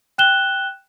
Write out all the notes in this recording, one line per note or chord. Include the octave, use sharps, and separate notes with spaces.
G5 F#6 E7 G7